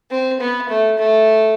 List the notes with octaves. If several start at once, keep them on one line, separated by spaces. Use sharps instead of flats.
C4
B3
A3
A3